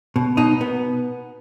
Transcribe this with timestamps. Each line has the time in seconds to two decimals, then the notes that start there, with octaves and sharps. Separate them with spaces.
0.16 B2
0.37 B2 D#4
0.61 B3